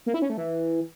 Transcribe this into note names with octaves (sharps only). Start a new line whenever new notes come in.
A#3
E4
C#4
A3
E3